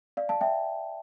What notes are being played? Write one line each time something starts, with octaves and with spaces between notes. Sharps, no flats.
D5 F5
F5 A5
E5 G5